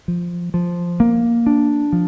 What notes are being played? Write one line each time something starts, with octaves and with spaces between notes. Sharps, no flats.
F3
F3
A#3
D4
F3